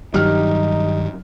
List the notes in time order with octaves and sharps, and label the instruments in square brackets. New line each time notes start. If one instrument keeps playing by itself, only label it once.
[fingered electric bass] G2 F#3 [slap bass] D#3 G3 [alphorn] D#4 [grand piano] G4 F6